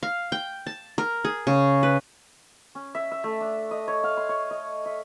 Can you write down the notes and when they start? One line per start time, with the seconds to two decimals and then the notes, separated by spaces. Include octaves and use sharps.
0.03 F5
0.32 G5
0.67 A5
0.98 A#4
1.25 G#4
1.47 C#3
1.83 B4
2.75 C#4
2.95 E5
3.11 E5
3.24 A3
3.41 D4
3.71 D#5
3.88 C#5
4.04 F5
4.17 C6
4.29 C#5
4.51 D#5
4.86 E5